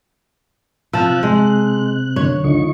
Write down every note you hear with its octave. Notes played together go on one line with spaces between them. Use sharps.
C3 F3 A5 E6 F#6
G#3
F#2 D3 C#5
C#2 D3 F3 D#4 C#6